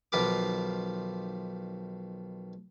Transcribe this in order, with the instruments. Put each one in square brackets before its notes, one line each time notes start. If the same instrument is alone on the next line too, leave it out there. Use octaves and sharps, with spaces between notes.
[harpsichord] B1 D#3 F3 F4 B4 D6